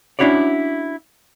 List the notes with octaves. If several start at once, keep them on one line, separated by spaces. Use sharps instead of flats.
C#4 D4 E4 F#4 C#5 D5